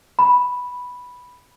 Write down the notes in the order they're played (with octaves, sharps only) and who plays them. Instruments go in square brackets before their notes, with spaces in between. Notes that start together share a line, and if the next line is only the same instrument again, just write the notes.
[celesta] B5